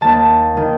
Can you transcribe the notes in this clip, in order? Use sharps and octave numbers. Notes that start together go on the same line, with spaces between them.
D#2 D#3 A5
D#3